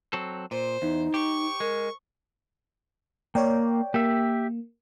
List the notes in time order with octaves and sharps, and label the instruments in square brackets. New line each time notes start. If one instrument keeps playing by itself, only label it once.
[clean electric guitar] F#3 C4 A4
[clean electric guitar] A#2 [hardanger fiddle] C5
[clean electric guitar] E2 [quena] D#4
[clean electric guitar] G4 [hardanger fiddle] C#6
[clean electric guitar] G#3 [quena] A#4
[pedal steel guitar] A#3 [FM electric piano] C#5 D5 G5
[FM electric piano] A#3 [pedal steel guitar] G4 E5